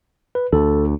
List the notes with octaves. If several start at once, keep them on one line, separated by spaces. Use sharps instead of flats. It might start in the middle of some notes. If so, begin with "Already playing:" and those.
B4
D2 A4